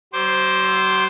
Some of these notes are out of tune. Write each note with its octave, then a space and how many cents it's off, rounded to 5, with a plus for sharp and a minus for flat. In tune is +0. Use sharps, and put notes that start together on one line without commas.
F#3 +40 C5 +0 D6 +0